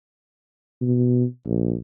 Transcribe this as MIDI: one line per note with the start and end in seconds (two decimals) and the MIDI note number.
0.82 1.25 47
1.46 1.75 34